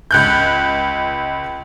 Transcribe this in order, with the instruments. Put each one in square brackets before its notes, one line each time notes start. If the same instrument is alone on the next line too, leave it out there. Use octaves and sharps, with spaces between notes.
[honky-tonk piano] C#2 F#6 G6